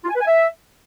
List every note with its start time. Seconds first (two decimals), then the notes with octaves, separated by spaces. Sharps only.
0.04 F4
0.09 G#5
0.15 B4
0.21 G#5
0.27 E5